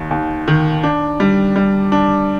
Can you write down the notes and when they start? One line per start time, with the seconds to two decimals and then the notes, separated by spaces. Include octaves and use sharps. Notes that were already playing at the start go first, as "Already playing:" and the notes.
Already playing: D#2 D#3
0.11 D#2
0.48 D#3
0.83 D4
1.20 G3
1.56 G3
1.92 D4